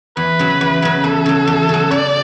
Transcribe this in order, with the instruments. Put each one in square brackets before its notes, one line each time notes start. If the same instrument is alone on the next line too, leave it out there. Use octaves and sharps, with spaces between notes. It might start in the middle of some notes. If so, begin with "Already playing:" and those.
[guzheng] E2 [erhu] B4
[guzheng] C#3 F#3
E2
C#3 F#3
[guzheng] E2 [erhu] A4
[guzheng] C#3 F#3
E2
C#3 F#3
[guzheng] C#3 [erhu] D5